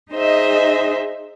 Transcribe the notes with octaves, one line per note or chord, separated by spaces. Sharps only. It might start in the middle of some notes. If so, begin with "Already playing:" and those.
D#4 G#4 C5 D#5 E5